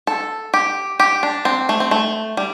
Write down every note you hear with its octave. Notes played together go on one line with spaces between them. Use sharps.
A4
G4
G4
D4
C4
A3
C4
A3
G3